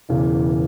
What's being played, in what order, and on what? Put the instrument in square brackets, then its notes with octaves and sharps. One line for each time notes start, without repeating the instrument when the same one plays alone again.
[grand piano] E1 E2 C#3 E3